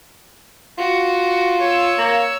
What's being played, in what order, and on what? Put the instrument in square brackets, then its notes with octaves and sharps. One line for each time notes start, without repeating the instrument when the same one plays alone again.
[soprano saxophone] F4 [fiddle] F#4
[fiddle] C#5 E6
[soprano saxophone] A#3